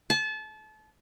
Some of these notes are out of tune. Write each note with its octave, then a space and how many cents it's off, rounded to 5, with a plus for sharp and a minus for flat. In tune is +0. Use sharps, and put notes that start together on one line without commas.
A5 -30